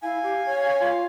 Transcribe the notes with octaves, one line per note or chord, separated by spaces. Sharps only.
E4 F5 G#5
G4
C#5
F4